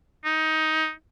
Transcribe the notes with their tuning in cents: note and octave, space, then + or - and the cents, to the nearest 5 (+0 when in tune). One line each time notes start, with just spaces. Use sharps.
D#4 +15